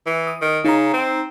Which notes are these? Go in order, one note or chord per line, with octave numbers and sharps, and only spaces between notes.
E3
D#6
D#3
C#3 D#4 A#5
C4